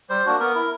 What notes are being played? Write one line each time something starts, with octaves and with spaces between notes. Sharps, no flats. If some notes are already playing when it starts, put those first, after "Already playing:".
G3 C5
A#3 D4 F#4
B3 A#4
E4